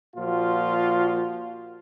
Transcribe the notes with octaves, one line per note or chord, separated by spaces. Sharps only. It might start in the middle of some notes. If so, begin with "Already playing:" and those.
A#2 F3 F4 F#4